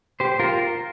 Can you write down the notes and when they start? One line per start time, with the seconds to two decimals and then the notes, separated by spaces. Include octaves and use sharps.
0.20 G4 C5
0.40 F4 A#4